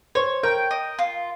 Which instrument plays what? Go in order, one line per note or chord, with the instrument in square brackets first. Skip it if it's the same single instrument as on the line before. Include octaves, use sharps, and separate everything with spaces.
[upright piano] C5 [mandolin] C#5
[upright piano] A#4 [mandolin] G5
[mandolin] D#5
F4